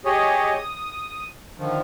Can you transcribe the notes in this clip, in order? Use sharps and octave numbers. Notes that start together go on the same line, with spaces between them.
G4 G#4 C#5 D#5
D#6
D3 D#3 F3